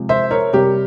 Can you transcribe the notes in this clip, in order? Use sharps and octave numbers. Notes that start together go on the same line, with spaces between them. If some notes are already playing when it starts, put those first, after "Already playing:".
Already playing: C3 F3 G#3
C5 E5
A#4 C#5
C3 G3 G4 A#4